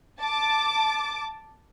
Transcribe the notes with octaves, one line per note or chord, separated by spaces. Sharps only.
A5 D6